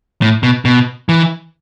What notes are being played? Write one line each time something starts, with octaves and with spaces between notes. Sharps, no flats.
A2
B2
B2
E3